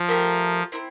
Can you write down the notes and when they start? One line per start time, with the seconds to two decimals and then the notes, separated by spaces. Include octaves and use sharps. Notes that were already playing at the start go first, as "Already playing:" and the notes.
Already playing: F3
0.08 A3 C4 G4 A#4
0.72 C4 E4 A#4